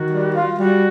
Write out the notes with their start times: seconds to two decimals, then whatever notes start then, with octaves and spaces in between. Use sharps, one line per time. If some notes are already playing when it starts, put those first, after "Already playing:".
Already playing: D#3 F#4
0.10 G3
0.35 F4
0.59 G3 F#4